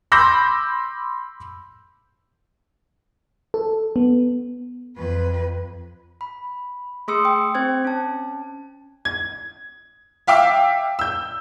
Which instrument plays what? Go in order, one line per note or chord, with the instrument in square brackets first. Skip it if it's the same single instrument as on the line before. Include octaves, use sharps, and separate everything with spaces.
[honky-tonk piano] B5 C6 D6 E6 G6 A#6
[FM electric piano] A4
B3
[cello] F2 B4
[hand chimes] B5
A3 G#4 C6 D#6 E6 C#7
G5
C4 C5 G#6
C#4 A5
[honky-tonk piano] G#6
E5 F5 G5 D6 E6
E6 G6